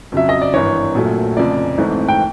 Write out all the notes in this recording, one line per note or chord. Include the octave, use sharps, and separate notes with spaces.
F2 C#3 F#3 E5
D#5
D5
G#1 G2 E3 C#5
A#1 A#2 F#3 A3
F1 F2 C#3 F3 D5
G#1 G#2 E3 A3 C4
G5